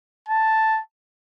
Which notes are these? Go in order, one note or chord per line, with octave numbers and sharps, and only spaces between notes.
A5